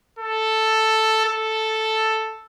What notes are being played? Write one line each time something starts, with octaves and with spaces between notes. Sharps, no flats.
A4
A4